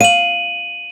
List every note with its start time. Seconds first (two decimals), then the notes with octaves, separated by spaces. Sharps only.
0.01 F5 D#7 F#7